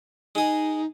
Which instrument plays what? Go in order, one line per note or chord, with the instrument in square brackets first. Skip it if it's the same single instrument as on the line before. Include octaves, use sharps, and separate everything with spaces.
[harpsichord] G#3 G#4 [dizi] D#4